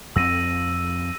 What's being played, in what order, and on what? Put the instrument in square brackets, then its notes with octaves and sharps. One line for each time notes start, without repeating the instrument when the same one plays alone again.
[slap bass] F2 C4 [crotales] E6 A#6 D#7